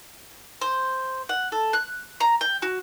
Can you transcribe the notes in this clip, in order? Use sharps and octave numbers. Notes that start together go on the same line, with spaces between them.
C5
F#5
A4
F#6
A#5
G5
F#4